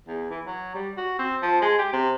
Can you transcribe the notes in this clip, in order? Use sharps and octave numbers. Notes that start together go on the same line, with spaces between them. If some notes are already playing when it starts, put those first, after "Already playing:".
E2
E3
F#3
G3
F#4
C4
F3
G#3
G4
C3